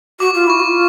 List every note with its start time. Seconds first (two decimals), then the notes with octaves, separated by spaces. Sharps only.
0.20 F#4 D6
0.34 F4
0.44 D6
0.47 E4 C#6
0.60 F#4
0.64 F4